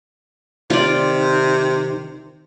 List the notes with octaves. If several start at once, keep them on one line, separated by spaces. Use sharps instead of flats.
C3 D#3 F4 D5